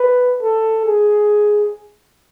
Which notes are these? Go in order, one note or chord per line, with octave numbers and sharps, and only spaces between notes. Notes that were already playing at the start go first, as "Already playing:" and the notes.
Already playing: B4
A4
G#4